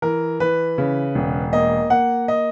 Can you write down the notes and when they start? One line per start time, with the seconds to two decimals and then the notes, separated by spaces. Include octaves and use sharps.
0.02 E3 A#4
0.40 E3 B4
0.78 C#3
1.15 E1
1.53 A#3 D#5
1.90 A#3 F#5
2.28 D#5